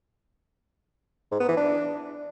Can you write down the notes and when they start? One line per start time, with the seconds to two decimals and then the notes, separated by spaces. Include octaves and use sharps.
1.31 G#2
1.40 B3
1.48 E3
1.57 D4